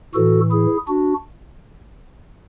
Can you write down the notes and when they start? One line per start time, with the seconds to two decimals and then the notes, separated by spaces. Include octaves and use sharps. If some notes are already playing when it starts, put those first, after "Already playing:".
0.14 A2 E3 F#4 A4
0.51 E4 G#4
0.88 D4 F#4